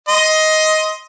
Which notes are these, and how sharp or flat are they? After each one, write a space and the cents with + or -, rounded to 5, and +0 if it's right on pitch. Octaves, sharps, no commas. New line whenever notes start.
D#5 +15 C6 +0